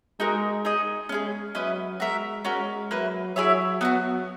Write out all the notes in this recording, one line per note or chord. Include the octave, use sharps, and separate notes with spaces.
G#3 D#4 F#4 A#4
D#4 G#4 D#5
G#3 C#4 E4 G#4
F#3 C#4 E4 B4 D#5
G#3 F#4 A#4 E5
G#3 C#4 F#4 A#4
F#3 A#3 E4 B4
F#3 E4 G#4 C#5 E5
F#3 B3 D#4 F#4